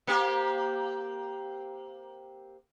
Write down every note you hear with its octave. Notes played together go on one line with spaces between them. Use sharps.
A#3 C4 G4